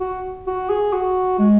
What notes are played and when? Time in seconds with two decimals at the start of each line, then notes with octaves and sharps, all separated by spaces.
0.01 F#4
0.47 F#4
0.70 G#4
0.93 F#4
1.39 G#3